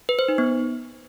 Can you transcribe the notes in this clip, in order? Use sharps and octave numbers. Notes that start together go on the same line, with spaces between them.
B4
C5
D#4
B3